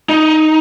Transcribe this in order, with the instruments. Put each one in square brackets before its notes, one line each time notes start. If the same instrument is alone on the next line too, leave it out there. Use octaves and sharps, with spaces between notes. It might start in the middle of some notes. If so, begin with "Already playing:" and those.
[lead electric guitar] D#4